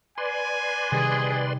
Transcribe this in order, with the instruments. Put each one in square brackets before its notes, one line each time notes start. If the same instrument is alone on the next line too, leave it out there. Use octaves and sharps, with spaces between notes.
[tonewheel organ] B4 D5 C6 [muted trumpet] G#5
[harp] C3 D#3 G3 [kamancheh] G#4